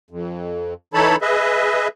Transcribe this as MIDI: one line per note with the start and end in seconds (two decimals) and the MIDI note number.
0.11 0.74 41
0.94 1.16 52
0.94 1.16 63
0.94 1.16 69
0.94 1.16 73
0.94 1.16 81
0.94 1.16 83
1.21 1.88 68
1.21 1.88 71
1.21 1.88 75
1.21 1.88 76